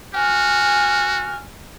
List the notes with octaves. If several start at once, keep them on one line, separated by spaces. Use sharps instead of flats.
F#4 G#5 F6